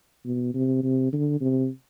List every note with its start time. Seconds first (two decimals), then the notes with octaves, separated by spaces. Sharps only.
0.25 B2
0.54 C3
0.83 C3
1.13 D3
1.41 C3